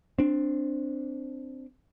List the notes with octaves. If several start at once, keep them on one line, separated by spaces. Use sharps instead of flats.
C4 D4